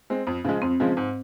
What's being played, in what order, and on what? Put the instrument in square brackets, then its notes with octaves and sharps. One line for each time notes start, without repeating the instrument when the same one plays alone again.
[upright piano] G#3 C4
F2
C#3 F3 G#3
[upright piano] F2 [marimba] C4
[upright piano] C#3 F3 G#3
G#2